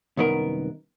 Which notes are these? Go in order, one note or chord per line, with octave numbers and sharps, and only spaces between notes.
C2 F#2 D#3 B3 A#4